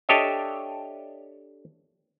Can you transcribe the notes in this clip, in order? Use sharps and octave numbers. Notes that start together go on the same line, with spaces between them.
D4 G4 A4 C#5 D#5 E5